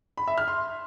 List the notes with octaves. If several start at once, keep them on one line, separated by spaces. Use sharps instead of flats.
B5
E5
F6
C6